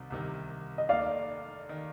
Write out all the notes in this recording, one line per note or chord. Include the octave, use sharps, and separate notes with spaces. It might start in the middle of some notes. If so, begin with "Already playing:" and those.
Already playing: C2 C3 D#3
C2 C3 D#3
D#5
F1 D#2 D#3 D5 F5
D#3